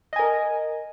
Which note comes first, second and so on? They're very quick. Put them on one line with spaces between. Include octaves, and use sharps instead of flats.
D#5 G#5 A#4